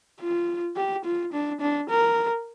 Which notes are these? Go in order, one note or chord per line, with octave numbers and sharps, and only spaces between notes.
F4
G4
F4
D4
D4
A#4